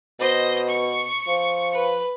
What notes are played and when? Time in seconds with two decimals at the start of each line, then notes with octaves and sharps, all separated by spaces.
0.20 B2 C5 D#5
0.68 C#6
1.27 F3
1.73 B4